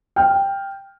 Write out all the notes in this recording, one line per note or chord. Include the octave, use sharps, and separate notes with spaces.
G5 F6